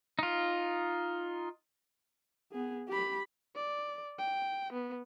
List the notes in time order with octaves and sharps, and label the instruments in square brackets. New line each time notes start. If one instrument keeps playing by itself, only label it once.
[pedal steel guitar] D#4 F4
[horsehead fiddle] B3 G#4
G4 B5
[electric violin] D5
G5
B3